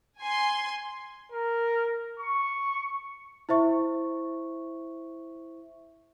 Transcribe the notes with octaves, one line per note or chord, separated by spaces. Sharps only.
G#5 C6
A#4
C#6
E4 C5 E5 C#6